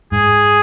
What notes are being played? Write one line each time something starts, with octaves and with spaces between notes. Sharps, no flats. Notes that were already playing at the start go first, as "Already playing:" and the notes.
G#2 G#4